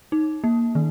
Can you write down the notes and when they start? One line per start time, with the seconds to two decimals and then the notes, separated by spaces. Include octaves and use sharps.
0.12 D#4
0.44 A#3
0.75 D#3